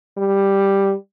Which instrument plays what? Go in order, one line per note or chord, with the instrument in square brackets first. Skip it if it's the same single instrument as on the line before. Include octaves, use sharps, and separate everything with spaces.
[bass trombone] G3